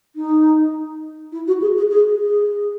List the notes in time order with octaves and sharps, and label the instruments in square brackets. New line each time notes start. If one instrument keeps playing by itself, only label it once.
[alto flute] D#4
E4
F#4
G#4
G#4
G#4
G#4